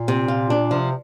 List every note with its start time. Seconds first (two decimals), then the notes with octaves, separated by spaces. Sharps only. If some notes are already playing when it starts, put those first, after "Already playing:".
Already playing: A#2
0.08 C3
0.28 F4
0.50 D4
0.71 C3 F3